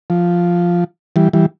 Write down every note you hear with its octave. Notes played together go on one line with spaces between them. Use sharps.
F3
E3 G3
E3 G3